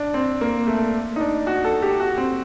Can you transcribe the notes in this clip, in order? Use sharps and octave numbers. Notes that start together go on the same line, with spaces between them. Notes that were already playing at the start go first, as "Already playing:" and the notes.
Already playing: D4
C4
A#3
A3
D#4
D4
F#4
A4
G4
F#4
C4